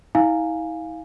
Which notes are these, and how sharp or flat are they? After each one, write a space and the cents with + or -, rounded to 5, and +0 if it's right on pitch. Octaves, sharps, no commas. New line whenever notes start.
E4 -45 F5 +0 G#5 +0